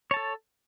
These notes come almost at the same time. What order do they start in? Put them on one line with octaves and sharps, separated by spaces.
C#5 A5 A4